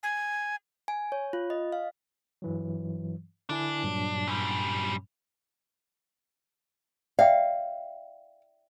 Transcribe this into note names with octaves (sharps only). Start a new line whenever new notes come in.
G#5
G#5
C#5
F4
D#5
F5
G2 E3 F#3
D3 D4 E4 G#5
G2 A#2 F#3
F#2 G3
D5 E5 F5 G5